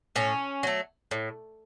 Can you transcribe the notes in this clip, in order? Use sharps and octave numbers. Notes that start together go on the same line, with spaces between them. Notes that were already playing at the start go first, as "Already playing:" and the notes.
A2 C#4
F#3 A3
A2